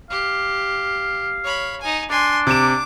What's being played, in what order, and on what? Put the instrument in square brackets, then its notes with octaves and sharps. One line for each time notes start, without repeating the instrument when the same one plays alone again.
[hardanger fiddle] G4 [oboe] F5
[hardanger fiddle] C#5 B5
D#4 G#5
[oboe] D4 [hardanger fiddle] G#5 C6
[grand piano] C3 E7 [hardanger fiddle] D6